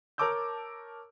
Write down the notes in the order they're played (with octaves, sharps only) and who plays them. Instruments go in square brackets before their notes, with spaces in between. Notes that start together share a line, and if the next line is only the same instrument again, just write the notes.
[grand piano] A#4 C#5 A5 D6 E6 G6